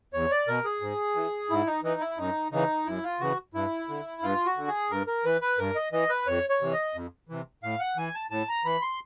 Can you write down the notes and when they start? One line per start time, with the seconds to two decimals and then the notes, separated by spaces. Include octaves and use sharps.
0.13 E2 C#5
0.31 D5
0.48 B2 A#4
0.65 G#4
0.81 G#2
1.15 E3
1.50 G#2 E4
1.67 D#4
1.83 E3 D#4
2.01 E4
2.17 F#2 D#4
2.52 C#3 E3 D#4
2.86 F#2 E4
3.04 F4
3.20 C#3 E3 F#4
3.54 G2 E4
3.89 D3
4.22 G2 F4
4.46 F#4
4.57 D3
4.68 G#4
4.91 G2 A#4
5.07 A#4
5.25 E3 B4
5.41 B4
5.59 G2 A#4
5.76 D#5
5.92 E3 D#5
6.10 B4
6.27 F2 C#5
6.50 C#5
6.61 C3 E3
6.73 D#5
6.95 F2
7.29 C3 E3
7.63 A2 F5
7.80 F#5
7.97 E3 G#5
8.15 A5
8.31 A2 A5
8.49 A#5
8.65 E3 B5
8.82 C6